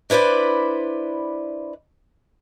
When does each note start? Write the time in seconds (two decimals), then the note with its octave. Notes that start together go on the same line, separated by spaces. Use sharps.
0.10 D4 E4 B4 C5 D5